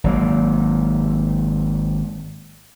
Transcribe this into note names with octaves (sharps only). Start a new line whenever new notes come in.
G#1 F#3 A#3